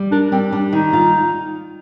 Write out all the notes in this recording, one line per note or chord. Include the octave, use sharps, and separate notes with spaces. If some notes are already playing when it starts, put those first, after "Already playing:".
Already playing: G3
D4 A#4
G3 C4
G3 D4
D#3 D#4
F4